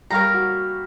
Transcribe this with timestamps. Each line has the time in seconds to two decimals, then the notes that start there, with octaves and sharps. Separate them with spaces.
0.10 G3 G4 A#4 C#5 F5 A#5
0.34 F#4